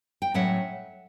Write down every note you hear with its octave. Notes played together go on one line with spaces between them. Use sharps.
G5
A2 F#3 A3 C#4 E5 F#5